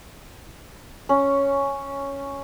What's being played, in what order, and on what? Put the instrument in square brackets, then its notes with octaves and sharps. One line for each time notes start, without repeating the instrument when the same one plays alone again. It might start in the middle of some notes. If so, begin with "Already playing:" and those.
[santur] C#4